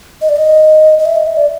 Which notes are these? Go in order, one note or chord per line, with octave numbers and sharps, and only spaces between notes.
D#5
D5
D#5
D#5
E5
D#5
E5
D5